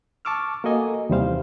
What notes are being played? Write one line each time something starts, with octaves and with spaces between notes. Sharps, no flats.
A5 C#6 D6 E6 F6
A#3 F#4 A4 D#5 G#5
D#2 C3 E3 G3 C5 F5